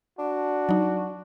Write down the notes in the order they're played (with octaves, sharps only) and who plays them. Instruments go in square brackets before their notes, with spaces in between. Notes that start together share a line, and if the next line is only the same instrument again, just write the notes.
[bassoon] D4 [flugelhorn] F#4
[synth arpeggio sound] F#3 D#4